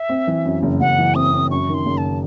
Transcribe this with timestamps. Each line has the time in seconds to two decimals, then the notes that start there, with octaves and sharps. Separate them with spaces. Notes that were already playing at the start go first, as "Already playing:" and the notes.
Already playing: E5
0.09 C4
0.27 E3
0.45 F#2
0.63 F#1
0.80 F#1 F#5
0.98 E3
1.15 C4 D#6
1.33 C4
1.51 F#2 C#6
1.69 D#3
1.74 C6
1.86 F#1
1.98 A5